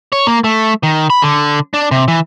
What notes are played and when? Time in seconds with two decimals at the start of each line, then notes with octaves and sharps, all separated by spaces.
0.12 C#5
0.27 A#3
0.44 A3
0.83 D#3
1.10 B5
1.22 D3
1.74 D4
1.91 C3
2.08 E3